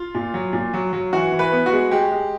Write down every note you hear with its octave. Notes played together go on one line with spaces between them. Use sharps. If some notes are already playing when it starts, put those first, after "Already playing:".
Already playing: F4
A#2
F#3
A#2
F#3
F#3
E3 F#4
E3
B4
B3
F#4
G#3
G#3 G4
G#3